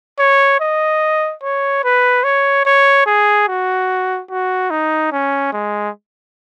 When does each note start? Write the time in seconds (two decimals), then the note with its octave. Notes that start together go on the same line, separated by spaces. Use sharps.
0.19 C#5
0.60 D#5
1.43 C#5
1.84 B4
2.24 C#5
2.66 C#5
3.06 G#4
3.48 F#4
4.30 F#4
4.71 D#4
5.12 C#4
5.53 G#3